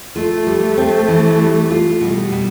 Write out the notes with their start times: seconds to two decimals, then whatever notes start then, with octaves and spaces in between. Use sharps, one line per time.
0.15 A3 F4
0.47 G3
0.77 C4
1.08 E3
1.40 G3
1.70 F4
2.01 B2 G3
2.32 B2